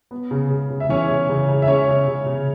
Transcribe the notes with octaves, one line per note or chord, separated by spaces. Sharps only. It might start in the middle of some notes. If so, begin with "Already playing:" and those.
B3
C#3
C#3
C#3
E5
E3 C#4 C#5
C#3
C#3
C#3
E5
C#4 C#5
C#3
C#3
C#3